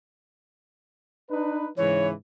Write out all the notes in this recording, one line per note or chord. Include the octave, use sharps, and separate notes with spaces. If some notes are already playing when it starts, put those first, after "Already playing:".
D4 D#4 B4
G#2 C#3 E3 C#5